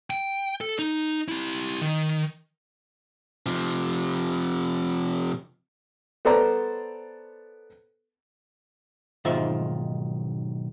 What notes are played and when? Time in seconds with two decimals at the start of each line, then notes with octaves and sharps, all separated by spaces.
0.10 G5
0.61 A4
0.79 D#4
1.28 E4 G4
1.81 D#3
3.46 C3 F3
6.25 B3 A4 C5 D5 A#5
9.25 B1 G#2 D#3 F4 C5 E5